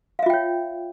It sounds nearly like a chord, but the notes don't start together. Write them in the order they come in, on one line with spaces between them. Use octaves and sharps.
F5 E5 F4 G5 C#5